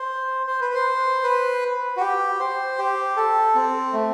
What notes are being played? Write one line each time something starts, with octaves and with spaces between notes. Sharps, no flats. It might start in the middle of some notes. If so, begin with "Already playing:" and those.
Already playing: C5
C5
B4
C5
B4
F#4
G4
C5
G4
A4
C4
A3